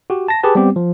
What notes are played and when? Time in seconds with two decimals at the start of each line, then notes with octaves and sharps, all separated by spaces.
0.10 F#4 G4
0.28 A5 A#6
0.43 G4 G#4 B4 A5
0.55 G3 B3 C4 G4
0.76 F3